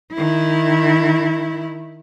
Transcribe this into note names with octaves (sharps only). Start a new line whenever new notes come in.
D#3 E4